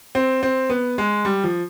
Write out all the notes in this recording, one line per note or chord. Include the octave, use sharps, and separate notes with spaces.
C4
C4
B3
G#3
G3
F3